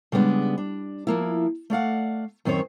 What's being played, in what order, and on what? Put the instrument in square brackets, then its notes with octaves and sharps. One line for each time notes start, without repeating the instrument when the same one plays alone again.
[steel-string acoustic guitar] C#3 G3 G#3 B3 D4
D4
F3 A#3 E4
A3 D5 F5 F#5
F#2 D#3 C4 C5 C#5